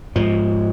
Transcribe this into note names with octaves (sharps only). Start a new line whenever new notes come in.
G#2 F3